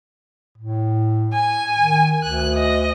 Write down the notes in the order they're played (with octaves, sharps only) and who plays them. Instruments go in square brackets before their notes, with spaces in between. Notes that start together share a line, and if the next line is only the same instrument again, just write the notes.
[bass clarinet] A2
[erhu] G#5
[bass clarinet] D#3
[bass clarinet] D2 [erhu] F#6
[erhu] D#5